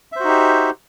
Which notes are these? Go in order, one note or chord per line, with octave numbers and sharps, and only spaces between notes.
D#4 F#4 G4 C5 E5